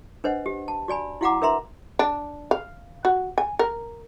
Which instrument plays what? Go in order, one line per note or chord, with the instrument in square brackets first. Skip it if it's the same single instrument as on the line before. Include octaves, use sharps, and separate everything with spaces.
[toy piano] D4 B4 C5 D#5 F#5
G4
A5
F#4 D5 G#5 B5
E4 F#4 F5 F#5 A#5 D6
D4 A#4 B4 E5 A#5 C6
[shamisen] D4
F5
F#4
G#5
A#4